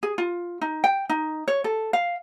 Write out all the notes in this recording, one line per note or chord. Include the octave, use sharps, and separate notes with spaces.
G#4
F4
D#4
G5
D#4
C#5
A4
F5